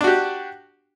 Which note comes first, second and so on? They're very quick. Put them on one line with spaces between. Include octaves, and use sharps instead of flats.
D4 F#4 G4